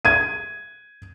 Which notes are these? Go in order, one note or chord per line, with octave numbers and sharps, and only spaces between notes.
G#6 D#7